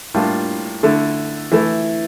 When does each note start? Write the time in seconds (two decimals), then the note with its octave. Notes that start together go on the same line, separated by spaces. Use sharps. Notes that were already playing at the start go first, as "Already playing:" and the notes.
0.14 A2 G3 A#3 D4 F4
0.83 D3 A3 E4
1.52 E3 A3 E4